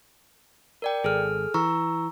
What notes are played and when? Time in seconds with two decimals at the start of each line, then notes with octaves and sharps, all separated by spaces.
0.82 A#4 D5 G5
1.04 G#1 G#4 A4 F6
1.54 E3 A#5 C#6 E6